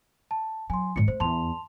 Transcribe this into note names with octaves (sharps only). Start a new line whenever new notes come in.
A5
F#3 G#5 C6
G#2 D#3 C#7
A3 C5
E2 A5 C6 F7